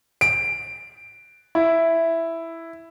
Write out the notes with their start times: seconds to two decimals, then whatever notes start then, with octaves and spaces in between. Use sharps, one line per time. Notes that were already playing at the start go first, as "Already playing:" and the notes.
0.21 D7
1.55 E4